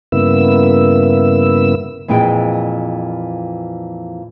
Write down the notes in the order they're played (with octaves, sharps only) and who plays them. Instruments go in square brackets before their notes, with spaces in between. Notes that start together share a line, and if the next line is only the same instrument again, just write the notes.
[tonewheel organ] G2 C#3 A#3 B3 E4 E6
[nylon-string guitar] F2 A#2 E3 G#3 G5